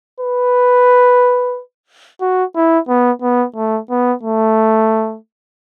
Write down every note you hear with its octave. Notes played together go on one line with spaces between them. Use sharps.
B4
F#4
E4
B3
B3
A3
B3
A3